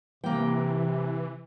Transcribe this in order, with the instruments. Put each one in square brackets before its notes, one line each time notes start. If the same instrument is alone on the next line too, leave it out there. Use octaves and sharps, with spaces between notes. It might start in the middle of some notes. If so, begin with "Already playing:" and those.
[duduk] C3 [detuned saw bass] E3 [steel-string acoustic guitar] A#3 G5